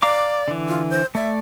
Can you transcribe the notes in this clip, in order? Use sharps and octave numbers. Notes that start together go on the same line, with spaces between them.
D5 F5 A#5 D6
D3 E3
F4
C5
A3 D5 E5